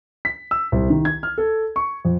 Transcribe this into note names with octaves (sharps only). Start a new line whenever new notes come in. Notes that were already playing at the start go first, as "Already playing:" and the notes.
B6
E6
C2
D#3
G#6
F6
A4
C#6
F2